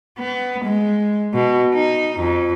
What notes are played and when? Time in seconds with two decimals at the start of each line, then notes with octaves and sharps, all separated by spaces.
0.19 B3
0.65 G#3
1.34 B2
1.74 D#4
2.19 F2